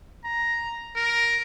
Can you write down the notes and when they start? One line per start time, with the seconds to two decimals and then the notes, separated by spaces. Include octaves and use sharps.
0.24 A#5
0.96 A#4